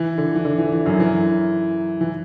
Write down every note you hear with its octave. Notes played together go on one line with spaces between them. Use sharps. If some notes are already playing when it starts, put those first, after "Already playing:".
Already playing: E3
D3
E3
D3
E3
E3
F#2 F#3
E3
E3